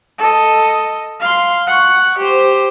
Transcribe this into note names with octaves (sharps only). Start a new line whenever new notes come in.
A4 D#5
F5 C6
F#5 C#6
G4 C5